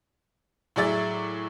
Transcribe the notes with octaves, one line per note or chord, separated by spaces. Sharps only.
A2 F#3 G#4 D5 E5 A6